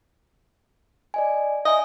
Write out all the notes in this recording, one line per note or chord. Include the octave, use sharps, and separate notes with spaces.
D5 D#5 G#5
D#5 E5 G#5